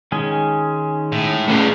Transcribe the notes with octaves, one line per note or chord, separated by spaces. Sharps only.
D#3 G#3 C#4
A2
C#3 A3 B3 C#4 G#4